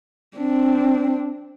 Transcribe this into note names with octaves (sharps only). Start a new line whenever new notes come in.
C4 D4